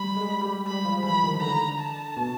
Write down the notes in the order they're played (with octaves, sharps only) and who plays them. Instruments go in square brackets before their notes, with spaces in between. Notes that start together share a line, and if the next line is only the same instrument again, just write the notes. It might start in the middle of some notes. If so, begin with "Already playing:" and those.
Already playing: [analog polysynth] G3 [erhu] B5
[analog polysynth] G#3
G3
[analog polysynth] G3 [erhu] B5
[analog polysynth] F3
[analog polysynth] E3 [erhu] B5
[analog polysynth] D#3
[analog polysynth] D3 [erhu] A#5
[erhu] A5
[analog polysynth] B2